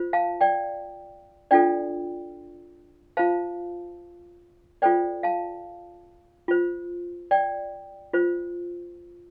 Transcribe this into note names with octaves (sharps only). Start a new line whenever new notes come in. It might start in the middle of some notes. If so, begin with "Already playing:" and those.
Already playing: F4 C5
F5 A5
D5 G5
D4 F4 A4 D5 G5
F4 C5 F5 A5
F4 A4 C5 D5 G5
F5 A5
F4 C5
D5 G5
F4 C5